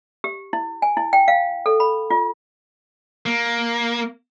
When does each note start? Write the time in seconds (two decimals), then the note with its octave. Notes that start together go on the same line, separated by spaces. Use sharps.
0.24 G4
0.53 E4
0.82 G#5
0.97 E4
1.13 G5
1.28 F5
1.66 A4
1.80 B5
2.10 F4
3.26 A#3